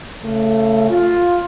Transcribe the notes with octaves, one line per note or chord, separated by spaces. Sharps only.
C#3 A3
F4